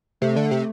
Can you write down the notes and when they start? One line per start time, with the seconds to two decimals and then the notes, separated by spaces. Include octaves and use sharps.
0.21 C3 A3
0.36 D3
0.51 C3